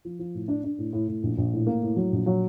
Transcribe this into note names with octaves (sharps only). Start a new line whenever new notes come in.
F3
F3
A2
D4
D4
A2
A2
A2
A#1
A#1
A2
A#3
A2
F#3
A#1
F#3